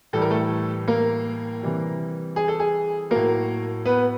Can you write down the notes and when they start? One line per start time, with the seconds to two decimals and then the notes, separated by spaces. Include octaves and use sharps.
0.13 A2 E3 G3 A4
0.22 A#4
0.30 A3 A4
0.88 A#3 A#4
1.62 C3 E3 G3
2.36 G#4
2.48 A4
2.60 G#4
3.11 A2 F#3 A#3 A#4
3.85 B3 B4